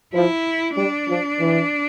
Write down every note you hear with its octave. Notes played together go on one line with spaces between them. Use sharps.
F3 E4
G3 D4
F3
E3